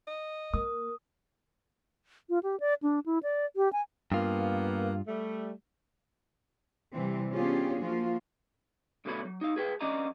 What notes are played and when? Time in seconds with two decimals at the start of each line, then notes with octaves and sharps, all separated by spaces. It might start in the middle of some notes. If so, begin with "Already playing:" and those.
0.07 D#5
0.54 A#3 A#4 D#6
2.29 F4
2.43 G4
2.60 D5
2.83 D4
3.06 E4
3.23 D5
3.56 G4
3.73 G#5
4.12 G2 A#3 B3 F4
5.07 G3 A3
6.94 C3 E3 G3 C4
7.33 B3 C#4 D4 F4 G4 G#4
7.83 F3 A#3 F4 F#4
9.05 B1 B2 D3 A3 C#5 B5
9.25 F#3
9.41 D#4 F5
9.56 G#4 B4 G5
9.81 F3 C#4 D4 D5 D#5 A#5